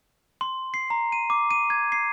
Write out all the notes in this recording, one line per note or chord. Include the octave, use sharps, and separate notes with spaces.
C6
C7
A#5
D#7
D6
D#7
G#6
C7